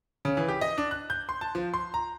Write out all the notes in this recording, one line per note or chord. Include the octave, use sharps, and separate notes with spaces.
C#3
E3
G4
D#5
D4
F#6
G6
C6
A5
F3
C6
A#5